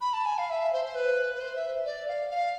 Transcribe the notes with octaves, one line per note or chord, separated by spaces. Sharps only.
B5
A5
G#5
F5
E5
C5
C5
B4
B4
C5
E5
D5
F5
F5